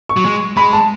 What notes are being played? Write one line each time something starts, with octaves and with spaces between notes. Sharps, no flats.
C#6
F#3
G#3
G#3 B5
A5